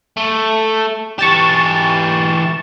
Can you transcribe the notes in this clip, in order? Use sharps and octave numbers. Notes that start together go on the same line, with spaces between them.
A3
E3 G4 C#6 A6 E7